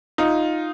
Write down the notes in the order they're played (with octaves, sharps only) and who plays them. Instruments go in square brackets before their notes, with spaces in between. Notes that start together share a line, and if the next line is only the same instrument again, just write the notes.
[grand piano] D#4 F4